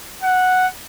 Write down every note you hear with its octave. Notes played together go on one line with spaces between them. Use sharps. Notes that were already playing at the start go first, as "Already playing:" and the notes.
F#5